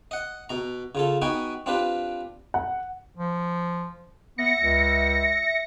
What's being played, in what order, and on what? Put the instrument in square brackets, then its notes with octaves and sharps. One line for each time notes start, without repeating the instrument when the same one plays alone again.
[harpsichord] D#5 F#5
B2 A#5
C#3 F4 A4
B3 D#4 F#4 G5 G#5
C4 D4 F4 G4 B4
[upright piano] F#5
[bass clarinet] F3
[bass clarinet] B3 [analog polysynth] E5 A#6 C#7
[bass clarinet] C#2